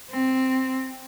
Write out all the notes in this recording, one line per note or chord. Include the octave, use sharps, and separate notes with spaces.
C4